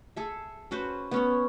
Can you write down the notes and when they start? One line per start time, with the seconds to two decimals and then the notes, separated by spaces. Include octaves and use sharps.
0.16 G#4 A4 E5
0.71 C#4 F#4 B4 C5
1.11 B3 C#4 C#5